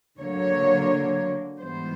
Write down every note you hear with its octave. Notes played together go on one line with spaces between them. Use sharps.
D3 F#3 A#3 C#5
G#2 E3 G3 B3 C5